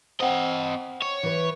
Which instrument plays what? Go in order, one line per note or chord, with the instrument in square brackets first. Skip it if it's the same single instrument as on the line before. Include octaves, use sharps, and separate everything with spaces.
[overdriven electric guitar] C4 D#5 [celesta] C5 F#5 G5
[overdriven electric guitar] C#5
[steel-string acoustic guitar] E3 B4